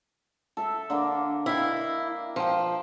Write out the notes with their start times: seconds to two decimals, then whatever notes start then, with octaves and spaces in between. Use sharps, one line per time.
0.57 A4 E5
0.90 D3 A#3
1.46 E4 D#5 F5 G5
2.36 F3 F5 G5